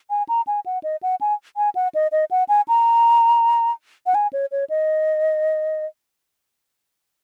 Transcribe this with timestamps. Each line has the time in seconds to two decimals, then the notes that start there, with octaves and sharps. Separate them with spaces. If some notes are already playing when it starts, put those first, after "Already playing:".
0.10 G#5
0.29 A#5
0.47 G#5
0.66 F#5
0.83 D#5
1.03 F#5
1.21 G#5
1.57 G#5
1.75 F#5
1.95 D#5
2.12 D#5
2.31 F#5
2.49 G#5
2.68 A#5
4.06 F#5
4.15 G#5
4.33 C#5
4.52 C#5
4.70 D#5